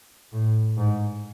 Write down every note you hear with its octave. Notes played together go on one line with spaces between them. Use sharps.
A2
G#2